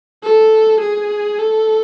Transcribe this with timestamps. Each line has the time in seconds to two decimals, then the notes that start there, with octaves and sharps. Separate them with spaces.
0.23 A4
0.81 G#4
1.39 A4